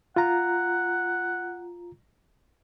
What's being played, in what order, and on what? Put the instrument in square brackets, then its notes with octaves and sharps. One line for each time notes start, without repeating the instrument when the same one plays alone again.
[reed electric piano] F4 A#5 [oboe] F#5